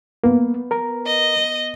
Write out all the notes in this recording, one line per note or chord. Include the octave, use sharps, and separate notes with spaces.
A#3 B3
A#4 A#5
D#5